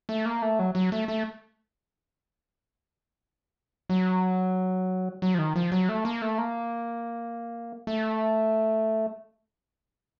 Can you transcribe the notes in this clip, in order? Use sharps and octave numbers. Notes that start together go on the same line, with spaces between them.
A3
A#3
A3
F#3
F#3
A3
A3
F#3
F#3
F3
D#3
F3
F#3
A3
A#3
A3
A#3
A3